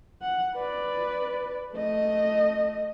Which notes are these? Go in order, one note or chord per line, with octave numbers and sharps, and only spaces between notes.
F#5
B4 D5
A3 D#5